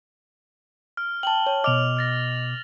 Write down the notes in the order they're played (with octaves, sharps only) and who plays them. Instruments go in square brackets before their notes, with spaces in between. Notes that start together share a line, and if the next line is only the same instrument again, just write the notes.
[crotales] F6
[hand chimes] G5 A5 [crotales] F#7 G7
[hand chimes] C#5
[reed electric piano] B2 D6 [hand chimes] D#5 [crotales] F6 F7 F#7
[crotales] F6 A6 A#6